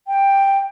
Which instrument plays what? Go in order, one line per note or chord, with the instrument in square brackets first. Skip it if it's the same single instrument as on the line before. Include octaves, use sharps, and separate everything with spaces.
[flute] G5